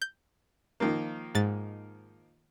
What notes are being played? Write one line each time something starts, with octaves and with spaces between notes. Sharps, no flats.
G6
D#3 F3 A#3
G#2 A6